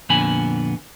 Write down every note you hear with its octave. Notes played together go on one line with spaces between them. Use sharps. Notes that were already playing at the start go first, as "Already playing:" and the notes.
F2 A#2 D3 B3 G#5 B5